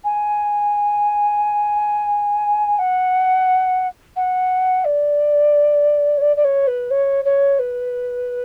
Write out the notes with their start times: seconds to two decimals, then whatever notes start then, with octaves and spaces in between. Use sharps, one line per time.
0.04 G#5
2.79 F#5
4.16 F#5
4.85 D5
6.17 C#5
6.21 D5
6.36 D5
6.44 C#5
6.67 B4
6.91 C#5
7.25 C#5
7.59 B4